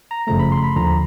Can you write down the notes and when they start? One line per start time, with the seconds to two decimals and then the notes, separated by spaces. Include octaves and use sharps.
0.11 A#5
0.27 G1 F#2 C#3 F3 A3 A#5
0.39 B5
0.52 C6
0.64 B5
0.76 D#2 D3 F3 A#5